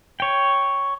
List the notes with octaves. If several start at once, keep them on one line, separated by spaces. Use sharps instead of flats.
C#5 G5